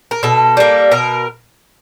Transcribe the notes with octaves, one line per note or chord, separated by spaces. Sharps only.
A#4
B2 A4
G3 A#3
B2 A#4